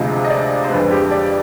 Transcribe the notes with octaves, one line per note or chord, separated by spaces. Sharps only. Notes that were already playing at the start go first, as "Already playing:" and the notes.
Already playing: D2 C3 F3 G#3 D#5
D#5
D5
C5
F2 D3 G#3 B4
G4
D5